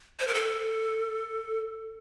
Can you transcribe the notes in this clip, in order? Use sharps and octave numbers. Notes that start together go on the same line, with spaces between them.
C5
A#4
A4